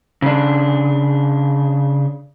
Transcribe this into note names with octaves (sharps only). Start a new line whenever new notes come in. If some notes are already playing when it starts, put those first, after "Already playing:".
C#3 D4